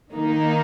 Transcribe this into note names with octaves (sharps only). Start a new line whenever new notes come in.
D#3 A#3 D#4